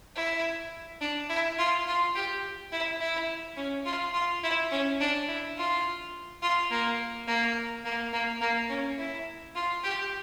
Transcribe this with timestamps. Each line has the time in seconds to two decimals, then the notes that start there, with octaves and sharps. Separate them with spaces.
0.15 E4
1.01 D4
1.29 E4
1.58 F4
1.87 F4
2.15 G4
2.73 E4
3.00 E4
3.57 C#4
3.85 F4
4.14 F4
4.43 E4
4.71 C#4
5.00 D4
5.28 E4
5.57 F4
6.42 F4
6.70 A#3
7.27 A#3
7.84 A#3
8.13 A#3
8.41 A#3
8.69 C#4
8.98 E4
9.55 F4
9.83 G4